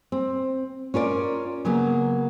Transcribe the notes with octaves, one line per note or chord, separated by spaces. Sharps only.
C4
C#4 F4 A#4 D5
C#3 F#3 A#3 B3